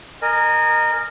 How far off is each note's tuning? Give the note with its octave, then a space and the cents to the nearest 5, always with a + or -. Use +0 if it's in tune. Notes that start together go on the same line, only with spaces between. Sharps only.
A#4 +0 D#5 -25 G#5 +0